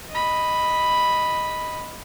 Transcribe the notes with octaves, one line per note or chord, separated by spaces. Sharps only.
D#5 B5